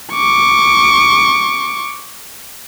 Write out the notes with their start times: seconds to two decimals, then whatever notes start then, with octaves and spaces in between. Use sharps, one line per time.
0.13 C#6 D6